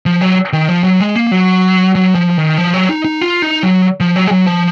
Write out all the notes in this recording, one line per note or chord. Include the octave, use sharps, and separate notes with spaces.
F3
F#3
D#3
F3
F#3
G#3
A#3
F#3
F#3
F3
D#3
F3
F#3
D#4
D#4
F4
D#4
F#3
F3
F#3
G#3
F#3
F3